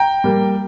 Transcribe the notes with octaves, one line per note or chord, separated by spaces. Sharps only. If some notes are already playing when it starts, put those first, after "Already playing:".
Already playing: G5 A#5
G3 A#3